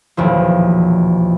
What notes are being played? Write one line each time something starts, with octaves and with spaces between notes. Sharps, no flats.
D#1 B1 E2 F3